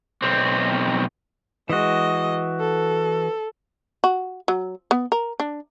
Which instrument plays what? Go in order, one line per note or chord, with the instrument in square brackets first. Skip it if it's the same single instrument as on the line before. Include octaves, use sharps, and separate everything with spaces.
[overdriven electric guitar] B1 C4
[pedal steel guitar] E3 F#4 [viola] G#3 D#5
[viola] A4
[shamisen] F#4
F#3
B3
A#4
D4